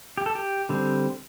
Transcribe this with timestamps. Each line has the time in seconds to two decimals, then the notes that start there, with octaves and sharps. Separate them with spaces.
0.18 G4
0.26 A4
0.35 G4
0.69 D3 G3 C4